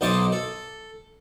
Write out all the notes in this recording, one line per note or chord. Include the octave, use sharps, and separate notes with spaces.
B1 D#4 C5 A5 C6 D6
A4